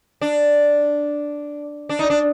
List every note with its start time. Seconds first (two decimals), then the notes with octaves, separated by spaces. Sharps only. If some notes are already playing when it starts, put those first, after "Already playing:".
0.21 D4
1.89 D4
1.99 D#4
2.10 D4